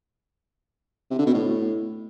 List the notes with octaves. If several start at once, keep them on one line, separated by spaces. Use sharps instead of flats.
C3
D3
B2
A2